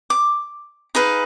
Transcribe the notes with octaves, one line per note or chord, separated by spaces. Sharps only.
D6
D#4 G#4 B4 F5